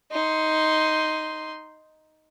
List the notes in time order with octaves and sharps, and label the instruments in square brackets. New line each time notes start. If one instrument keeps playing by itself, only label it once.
[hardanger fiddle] D#4 C6